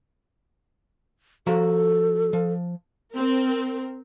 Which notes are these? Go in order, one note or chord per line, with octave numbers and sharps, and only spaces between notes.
F3 F#4 A4 A#5
F3
C4 A#4